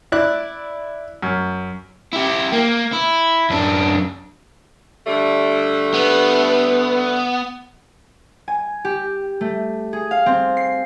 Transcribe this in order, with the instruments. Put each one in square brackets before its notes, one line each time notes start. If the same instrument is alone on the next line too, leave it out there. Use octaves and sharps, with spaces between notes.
[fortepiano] E4 D5 F#6
F#2
[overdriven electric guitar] E4 G4
A#3
E4
F#2 D4
[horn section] D3 G3 A3
[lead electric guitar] B3
[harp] G#5
G4
A3
G#4
F5
C4
C7